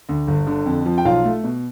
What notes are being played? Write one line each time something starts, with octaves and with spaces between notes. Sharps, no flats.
D2
G1
D3
F2
F3
G5
B1 F4 F5
A3
B2